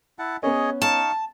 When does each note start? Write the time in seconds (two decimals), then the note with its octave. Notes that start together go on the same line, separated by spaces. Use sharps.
0.19 E4 F#5 A5
0.43 B3 C#4 G#4 C#5 D#5
0.82 D#4 F5 A5 C#6